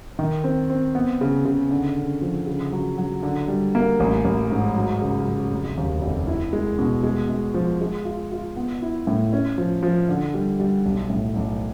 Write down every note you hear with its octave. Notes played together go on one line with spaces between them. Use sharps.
D#3
C4
C4
B3
C#3
C#3
D3
D3
F3
C#3
F#3
F#3
D3
G3
A#3
A1
A1
G#2
F#3
C#3
F#3
F1
D#2
F1
E4
G#3
B2
G#3
G#3
F3
G#3
F4
F4
B3
E4
A2
C#4
F3
F3
D3
G3
G3
B1
A2
B1